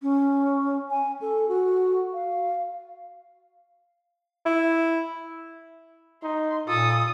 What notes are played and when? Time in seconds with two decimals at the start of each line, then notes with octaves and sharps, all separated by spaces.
0.02 C#4
0.90 G#5
1.21 A4
1.48 F#4
2.13 F5
4.46 E4
6.23 D#4 C6
6.68 A#2 F4 A4 D#6